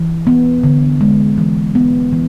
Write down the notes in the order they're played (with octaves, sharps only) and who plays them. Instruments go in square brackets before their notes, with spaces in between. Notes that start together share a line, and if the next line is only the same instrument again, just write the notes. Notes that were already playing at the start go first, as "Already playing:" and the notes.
Already playing: [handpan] E3
B3
D3
G#3
E3
B3
E3